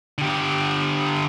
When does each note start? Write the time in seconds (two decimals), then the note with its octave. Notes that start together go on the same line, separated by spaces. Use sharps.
0.18 D3 G4